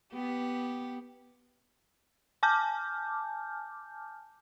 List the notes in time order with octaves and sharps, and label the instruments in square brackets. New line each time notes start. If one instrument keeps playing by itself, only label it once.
[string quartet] B3 G4
[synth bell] G#5 A5 D6 F6 G6